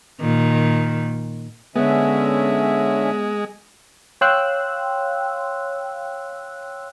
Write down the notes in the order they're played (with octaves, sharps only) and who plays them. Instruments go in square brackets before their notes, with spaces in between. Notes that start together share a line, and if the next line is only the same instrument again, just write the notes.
[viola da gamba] A#2 D#3
[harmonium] D3 C#4 E5 [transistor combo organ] G#3 [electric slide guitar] B3
[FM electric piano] C#5 F5 G5 C6 E6 F#6